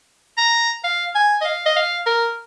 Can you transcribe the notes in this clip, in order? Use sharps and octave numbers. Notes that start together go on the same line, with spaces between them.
A#5
F5
G#5
D#5
F5
D#5
F5
A#4